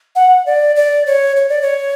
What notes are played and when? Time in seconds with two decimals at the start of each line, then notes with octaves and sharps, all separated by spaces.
0.16 F#5
0.46 D5
0.76 D5
1.07 C#5
1.36 C#5
1.49 D5
1.62 C#5